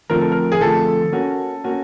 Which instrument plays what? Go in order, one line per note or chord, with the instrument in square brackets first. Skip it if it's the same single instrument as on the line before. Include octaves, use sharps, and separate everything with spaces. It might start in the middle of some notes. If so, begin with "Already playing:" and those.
[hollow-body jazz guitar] D3 F3 A3 C4 F4 [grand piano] A#4
[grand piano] A4
A#4
G#4
[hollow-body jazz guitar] D3 F3 A3 C4 F4 [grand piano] A4
[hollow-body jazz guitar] A#3 C#4 F#4
A#3 C#4 F#4